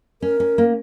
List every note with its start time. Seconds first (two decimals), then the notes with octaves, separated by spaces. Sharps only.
0.22 C#4 A#4
0.40 C#4
0.58 A#3